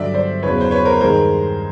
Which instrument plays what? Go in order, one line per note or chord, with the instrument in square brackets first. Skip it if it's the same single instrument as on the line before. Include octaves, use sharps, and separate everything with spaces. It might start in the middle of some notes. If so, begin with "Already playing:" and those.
Already playing: [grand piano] G2 D3 F#3 D5 E5
C5 D5
E2 C#3 F#3 B4 C#5
C5
B4 C#5
A#4 C5
G2 D#3 G#3 A#4 C5